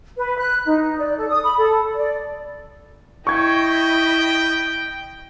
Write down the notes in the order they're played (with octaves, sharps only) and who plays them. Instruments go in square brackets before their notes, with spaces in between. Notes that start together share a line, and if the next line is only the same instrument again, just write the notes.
[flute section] B4
F#6
D#4
D5
A4
D#6
B5
A4
D5
[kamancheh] E4 D#5 [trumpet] G5 [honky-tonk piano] C#6 G#6